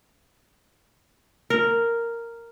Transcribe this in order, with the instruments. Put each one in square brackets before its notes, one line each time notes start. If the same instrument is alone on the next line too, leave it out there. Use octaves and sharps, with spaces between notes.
[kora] A#4